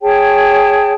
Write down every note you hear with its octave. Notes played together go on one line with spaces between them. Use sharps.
G#4 C#5 G5 A5